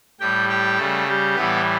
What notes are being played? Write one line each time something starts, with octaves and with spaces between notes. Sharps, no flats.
A2 G3 G4 G5
G4 G5
C#3 G3 A3 A4
G3 G4
A2 E3 G3 B3 B4